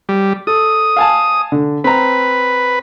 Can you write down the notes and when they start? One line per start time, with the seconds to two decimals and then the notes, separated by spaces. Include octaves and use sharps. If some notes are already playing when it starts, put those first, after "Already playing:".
0.09 G3
0.47 A4 D#6
0.97 F5 G#5 A5
1.52 D3
1.84 C4 B4 A#5